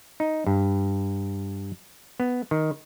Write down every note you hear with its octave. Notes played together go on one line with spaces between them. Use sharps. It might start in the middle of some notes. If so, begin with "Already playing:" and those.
D#4
G2
B3
D#3